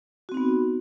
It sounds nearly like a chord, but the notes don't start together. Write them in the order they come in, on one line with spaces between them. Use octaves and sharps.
F#4 C4 D#4 B3